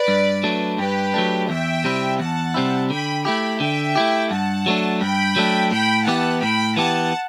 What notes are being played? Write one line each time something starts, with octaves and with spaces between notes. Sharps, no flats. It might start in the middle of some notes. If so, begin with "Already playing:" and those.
Already playing: B4 D5
G2
F#3 A3 D4
G2 G4 B4
F#3 A3 D4
E2 E5 G5
C3 G3 C4 E4
E2 F#5 A5
C3 G3 C4 E4
D3 G5 B5
A3 E4 G4 G5 B5
D3 E5 G5
A3 E4 G4
G2 F#5 A5
F#3 A3 D4
G2 G5 B5
F#3 A3 D4
A2 G5 B5
E3 B3 E4 G4 F#5 A5
A2 G5 B5
E3 B3 E4 G4 F#5 A5